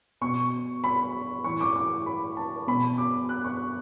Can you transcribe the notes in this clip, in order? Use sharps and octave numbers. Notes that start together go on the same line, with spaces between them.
B2 C#6
B5
A2 E3 C#6
D6
D6
B5
A5
B2 B5
D6
F#6
C#6